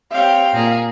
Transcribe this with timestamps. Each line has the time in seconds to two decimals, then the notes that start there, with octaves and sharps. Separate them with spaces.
0.11 C4 G4 C#5 F5
0.53 A#2 A#3 G#4